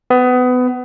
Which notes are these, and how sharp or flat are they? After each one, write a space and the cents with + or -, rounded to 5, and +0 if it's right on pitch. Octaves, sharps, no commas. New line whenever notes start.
B3 +25